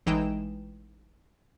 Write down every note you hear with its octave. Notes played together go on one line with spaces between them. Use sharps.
A1 E3 G#3 D#4 G5 E7